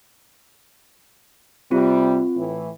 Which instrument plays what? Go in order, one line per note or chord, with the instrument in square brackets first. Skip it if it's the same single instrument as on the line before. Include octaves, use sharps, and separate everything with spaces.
[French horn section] C3 G3 [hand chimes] C4 F4
[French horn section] A2 E3